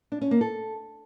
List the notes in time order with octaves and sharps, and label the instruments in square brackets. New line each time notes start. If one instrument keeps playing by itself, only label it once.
[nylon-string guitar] D4
C#4
A#3
A4